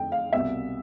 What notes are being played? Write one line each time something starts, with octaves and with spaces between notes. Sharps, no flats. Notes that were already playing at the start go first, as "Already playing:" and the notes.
Already playing: F2 D3 G5
F5
C2 B2 E5